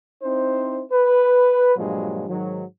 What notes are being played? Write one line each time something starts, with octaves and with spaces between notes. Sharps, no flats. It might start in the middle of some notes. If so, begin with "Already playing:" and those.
C4 D#4 E4 C5
B4
G2 A#2 F3 F#3 G#3
G#2 D#3 F#3